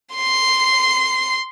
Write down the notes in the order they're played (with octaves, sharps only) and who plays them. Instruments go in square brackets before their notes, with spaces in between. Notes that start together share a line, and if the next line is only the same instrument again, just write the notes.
[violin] C6 C7